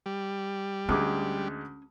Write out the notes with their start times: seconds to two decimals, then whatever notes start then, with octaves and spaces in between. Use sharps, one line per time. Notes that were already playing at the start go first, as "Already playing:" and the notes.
0.06 G3
0.89 D2 G#3 C#4 D6